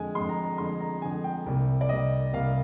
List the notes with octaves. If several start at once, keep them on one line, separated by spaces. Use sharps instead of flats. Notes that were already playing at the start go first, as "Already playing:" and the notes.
Already playing: F2 D3 G#3 G#5
F2 D3 G#3 C6
A#5
A#5
F2 D3 G#3 C6
A#5
F2 D3 G#3 G#5
G5
C2 C3 G3 A#3
D5
C2 C3 G3 A#3 D#5
C2 C3 G3 A#3 F5